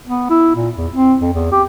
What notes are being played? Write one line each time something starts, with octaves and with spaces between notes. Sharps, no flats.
B3
E4
A#2
E2
C4
F2
E2
G4